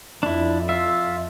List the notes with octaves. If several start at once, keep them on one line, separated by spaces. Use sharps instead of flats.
F2 D4 E4
F4 E5